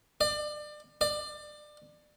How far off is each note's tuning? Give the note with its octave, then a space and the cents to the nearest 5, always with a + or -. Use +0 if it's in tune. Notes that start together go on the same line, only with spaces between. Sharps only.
D5 +30
D5 +25